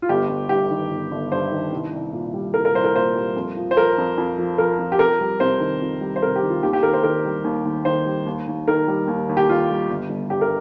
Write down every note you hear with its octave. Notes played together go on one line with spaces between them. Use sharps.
F4
G1 G4
G1
G2 G4
D#3
G1
G1
G2 C5
D#3
C2
C2
A#2
G3
C2 A#4
A#4
C2 C5
A#4
A#2 C5
G3
F2
F3
C5
F3 A#4
F2
F2
F3
F3 A#4
F2
G4
F2 A#4
G3
C3 C5
D#3
F2
G3
C5
C3 A#4
G4
D#3
F4
D#2 G4
G4
D#2 A#4
C5
D#3 A#4
G3
D#2
D#2
D#3 C5
G3
D#2
D#2
D#3 A#4
G3
D#2
D#2
G4
D#3 F4
G3
G1
G1
G2 G4
A#4